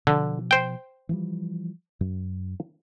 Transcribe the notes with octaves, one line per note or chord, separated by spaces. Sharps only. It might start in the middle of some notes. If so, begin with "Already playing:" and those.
B2 D3 F3
C5 G5
E3 F3 G3
F#2